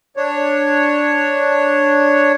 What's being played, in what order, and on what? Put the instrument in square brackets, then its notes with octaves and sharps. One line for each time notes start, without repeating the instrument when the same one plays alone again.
[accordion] D4 C#5